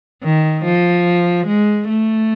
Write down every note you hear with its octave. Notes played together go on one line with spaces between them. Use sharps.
D#3
F3
G#3
A3